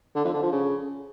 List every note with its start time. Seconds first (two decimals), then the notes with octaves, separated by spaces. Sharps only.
0.15 D3
0.24 F2
0.34 D3
0.43 F3
0.52 C#3